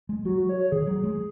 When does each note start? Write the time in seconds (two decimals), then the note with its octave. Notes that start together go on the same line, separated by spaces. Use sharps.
0.09 G#3
0.25 F#3 F#4
0.37 F#4
0.49 C#5
0.60 C#5
0.72 D#3 G#4
0.87 F#3
1.04 G#3